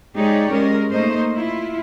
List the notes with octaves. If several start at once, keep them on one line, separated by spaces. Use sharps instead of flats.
G#3 D#4 G4 G#4 C#5 D5
G#3 C#4 A#4
A3 A#3 D#4 C5 D#5
E4 F4